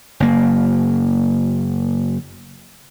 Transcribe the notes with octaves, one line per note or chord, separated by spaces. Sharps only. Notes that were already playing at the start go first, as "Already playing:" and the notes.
F#1 A#3